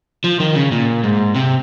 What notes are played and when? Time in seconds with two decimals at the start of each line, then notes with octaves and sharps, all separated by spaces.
0.24 F3
0.40 D#3
0.55 C#3
0.72 A#2
1.03 G#2
1.34 C3